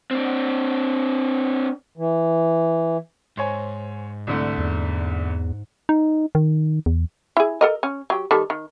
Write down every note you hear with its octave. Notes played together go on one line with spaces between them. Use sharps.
C4 D4
E3
G#2 C5 C#5 G#5
C2 D3 A3
E2
D#4
D#3
E2
E4 G#4
A4 A#4 D#5
C#4
F#3 G4
D#3 G3 A4
D#3